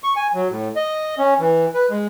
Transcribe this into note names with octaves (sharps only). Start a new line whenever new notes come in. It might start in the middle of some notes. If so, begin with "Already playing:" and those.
C#6
G#5
F#3
A2
D#5
C#4
E3
B4
G#3